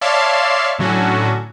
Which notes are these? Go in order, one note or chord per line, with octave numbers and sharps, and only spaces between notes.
C#5 D5 E5 F5 A5 C6
A2 D3 F#3 C#4 F#4 A4